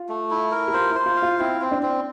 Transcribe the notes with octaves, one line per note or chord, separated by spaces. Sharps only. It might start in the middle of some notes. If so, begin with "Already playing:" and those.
Already playing: F4
A3
E4
A#4
G4
F4 C5
E4
C5
F4
F5
F4
C4 E4
C4
D4
C4